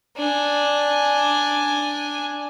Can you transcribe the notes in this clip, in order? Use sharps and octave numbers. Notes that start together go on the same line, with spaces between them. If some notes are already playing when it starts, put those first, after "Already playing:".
D4 G#5